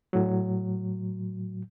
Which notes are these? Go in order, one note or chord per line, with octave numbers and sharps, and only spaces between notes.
A2 F#3